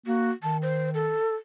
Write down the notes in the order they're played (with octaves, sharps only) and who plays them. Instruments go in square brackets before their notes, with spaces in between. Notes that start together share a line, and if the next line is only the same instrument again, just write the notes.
[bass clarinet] A#3 [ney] F#4
[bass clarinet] D#3 [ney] A5
[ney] C5
A4